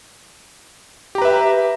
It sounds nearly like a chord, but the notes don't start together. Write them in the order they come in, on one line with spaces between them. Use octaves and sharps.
G4 A#5 B4 E5